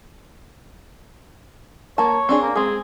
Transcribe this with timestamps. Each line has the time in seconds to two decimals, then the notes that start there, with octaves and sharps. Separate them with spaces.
1.98 A#3 C#5 A5
2.29 C4 D4 G#4
2.42 A#3
2.56 G#3 C4 G#4